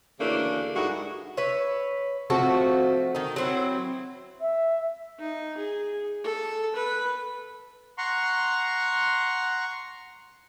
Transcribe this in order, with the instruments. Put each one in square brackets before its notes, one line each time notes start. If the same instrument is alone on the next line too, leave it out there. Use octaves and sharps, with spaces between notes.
[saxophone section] D2 C#3 E3 A3 A#3 D4
G2 G#3 D#4 E4 F#4
[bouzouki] B4 C#5 E5
F3 A3 C4 F#4
D#3 D#4
F#3 C4 E4
[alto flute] E5
[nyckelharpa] D#4
G#4
A4
B4
[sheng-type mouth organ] F#5 A#5 C6 C#6